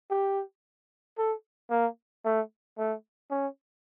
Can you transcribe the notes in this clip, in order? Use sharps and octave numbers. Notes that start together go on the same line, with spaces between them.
G4
A4
A#3
A3
A3
C#4